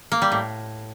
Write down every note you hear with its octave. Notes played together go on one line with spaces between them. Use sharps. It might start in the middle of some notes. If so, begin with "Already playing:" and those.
A#3
G3
A2